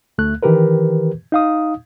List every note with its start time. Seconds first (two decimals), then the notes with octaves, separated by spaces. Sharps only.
0.18 D2 A3 F#6
0.43 D#3 E3 G4 A#4 B4
1.32 D#4 F5 D#6